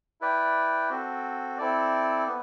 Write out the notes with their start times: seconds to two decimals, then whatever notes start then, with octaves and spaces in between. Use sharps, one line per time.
0.21 E4 B4 D5 G5
0.90 C4 F#4 A4
1.58 C4 E4 A4 D5
2.27 B3